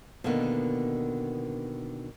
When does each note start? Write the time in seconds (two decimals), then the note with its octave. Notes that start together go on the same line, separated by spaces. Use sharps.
0.24 B2 D3 D#3 A#3 B3